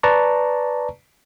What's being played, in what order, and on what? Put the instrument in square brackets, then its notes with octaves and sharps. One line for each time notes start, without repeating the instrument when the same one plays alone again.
[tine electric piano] B4 D5 A5 A#5 C#6